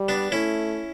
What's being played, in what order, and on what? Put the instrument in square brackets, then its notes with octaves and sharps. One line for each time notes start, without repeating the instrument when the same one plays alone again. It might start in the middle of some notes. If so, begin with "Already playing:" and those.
Already playing: [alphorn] G3
[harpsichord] B3 D4
[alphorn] A3 [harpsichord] C#4 E4